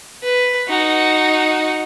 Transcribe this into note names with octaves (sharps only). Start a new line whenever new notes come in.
B4
D#4 F#4